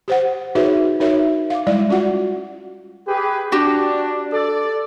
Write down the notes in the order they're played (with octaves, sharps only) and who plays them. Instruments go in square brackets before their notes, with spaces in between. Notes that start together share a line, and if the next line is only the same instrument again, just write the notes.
[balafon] G4 C5 F#5
D#4 F#4 G#4 B4 C#5 E5
D#4 F#4 A#4 C#5 E5
F5 D6
G3 G#3 E4 D5
C#4 F4 F#4 F#5
[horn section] G4 G#4 B4
[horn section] D4 [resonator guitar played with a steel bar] F#4 G4
[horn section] A4 D5